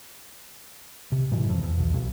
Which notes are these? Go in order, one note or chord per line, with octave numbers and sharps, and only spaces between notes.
C3
G#2 B2 E3 F#3
F2
E2
B1
B1